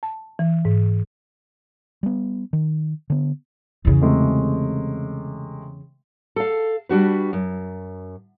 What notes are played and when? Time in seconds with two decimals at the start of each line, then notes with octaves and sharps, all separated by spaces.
0.03 A5
0.39 E3
0.65 G#2
2.03 G3 B3
2.53 D#3
3.10 D3 B3
3.85 E2 C#3
4.02 C3 G#3 A3
6.36 A4 F5
6.89 G3 D4 F#4 B4
7.33 F#2